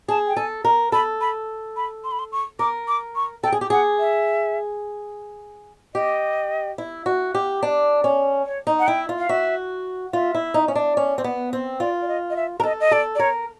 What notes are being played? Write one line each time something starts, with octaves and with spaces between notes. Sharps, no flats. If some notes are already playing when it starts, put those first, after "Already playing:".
G#4 A5
G5
A4 G#5
A#4
A4 B5
B5
B5
C6
B5
C6
C#6
A#4 D6
D6
C#6
A4 G5
G#4
G4
G#4 F#5
E5
G4 D#5
E4
F#4
G4
D4
C#4
C#5
D#4
F#5
E4 G5
F4
F5
F#4 E5
F4 E5
E4
D#4
C#4
D4
C#4
C4
B3
C4
F4 D5
D5
D#5
D#5
E5
A#4
A4 D#5
D#5
A4 D5
D5
A#4 C#5